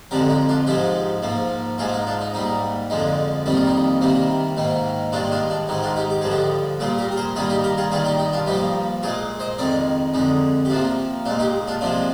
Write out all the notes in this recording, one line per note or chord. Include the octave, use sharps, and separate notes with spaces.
F2 D3 F3 G#3 G4 A#4
D#4
D4 F4
G#2 F3 G#3 D#4 G4
G#2 F3 A#3
G#2 F3 G#3 F4 G#4
D#4
D4 F4
D#4
G#2 G3 A#3 D#4
F2 D3 F3 G#3 D#4
F2 D#3 G3 A#3 D#4
F4
D#4
C3 D#3 G3 A#3
G#2 D#3 A#3
G2 D#3 G#3 D4 F4
D4 F4
D4
G#2 D#3 G#3 D#4
D4 F4
D#4 G4
G4
G2 D3 F3 G#4
D#4 G4
A#2 G3 A#3 F4 G#4
G4 A#4
A#4
G#4 C5
G2 D#3 G3 A#3 F4 G#4
D#4 G4
G4 A#4
F4 G#4
G2 D#3 G3 F4 G#4
D#4 G4
D#4
D4 F4
G2 F3 A#3 D#4 G4
A#2 G#3 F4 G#4
C5 D#5
F2 D#3 G#3 A#4 D5
F2 D3 G#3 D#4
G4
C3 F3 A#3 D4 F4
A#2 G#3 D4 F4
D#4 G4
D4 F4
C3 F3 G#3 D4 F4